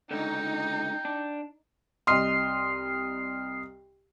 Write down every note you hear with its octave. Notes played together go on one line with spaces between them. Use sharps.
C#2 D3 D#4 G5
D4
C2 D#5 C6 D#6 F6 C7